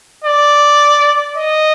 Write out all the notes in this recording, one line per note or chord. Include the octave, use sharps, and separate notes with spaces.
D5
D#5